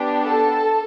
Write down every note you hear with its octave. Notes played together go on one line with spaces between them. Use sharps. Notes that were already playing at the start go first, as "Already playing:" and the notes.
Already playing: B3 D4 G4
A4 A5